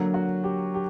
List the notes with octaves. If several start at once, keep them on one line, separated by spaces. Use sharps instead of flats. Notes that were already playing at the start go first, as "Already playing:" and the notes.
Already playing: D3 F#3 A#3
F#4
G4
G4